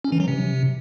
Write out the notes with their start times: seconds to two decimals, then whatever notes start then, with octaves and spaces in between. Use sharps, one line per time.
0.04 C#4
0.12 E3
0.20 F#3
0.28 C3